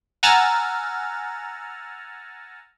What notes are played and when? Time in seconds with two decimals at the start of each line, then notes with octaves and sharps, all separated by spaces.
0.23 F#5 G#5 A#5 E6 F6 A6